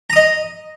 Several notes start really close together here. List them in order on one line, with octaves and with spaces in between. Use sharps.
A#5 D#6 D#5